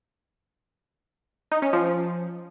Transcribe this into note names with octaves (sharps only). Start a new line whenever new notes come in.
D#4
C#4
F3